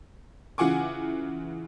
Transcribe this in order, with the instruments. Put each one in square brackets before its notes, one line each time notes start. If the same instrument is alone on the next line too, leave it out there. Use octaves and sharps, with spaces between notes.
[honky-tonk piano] C#3 E3 F4 F#5 G#5 D6